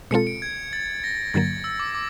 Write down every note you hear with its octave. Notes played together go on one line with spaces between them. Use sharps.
B2 G#3 C4 F4 A4 C#7
D7
G#6
A6
A#6
G2 D3 F#3 A#3 A6
E6
D6
D6